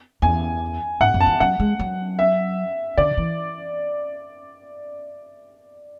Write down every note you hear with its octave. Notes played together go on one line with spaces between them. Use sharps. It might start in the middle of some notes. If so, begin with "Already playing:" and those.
E2 G#5
G#2 F#5
F#2
A5
E3
F#3 F#5
G#3
F#3
E5
D3 D5
E3